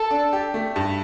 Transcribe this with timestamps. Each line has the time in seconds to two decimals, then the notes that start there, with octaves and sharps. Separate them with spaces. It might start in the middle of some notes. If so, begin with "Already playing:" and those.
Already playing: A4
0.11 D4
0.33 G4
0.54 A3
0.76 G2